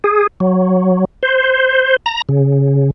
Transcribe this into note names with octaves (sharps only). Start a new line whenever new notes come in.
G#4
F#3
C5
A#5
C#3